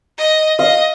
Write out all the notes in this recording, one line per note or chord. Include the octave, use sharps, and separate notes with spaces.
D#5
D#5 F5